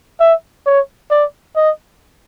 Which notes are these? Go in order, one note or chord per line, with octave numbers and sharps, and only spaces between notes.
E5
C#5
D5
D#5